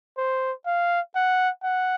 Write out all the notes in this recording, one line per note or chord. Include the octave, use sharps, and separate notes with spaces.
C5
F5
F#5
F#5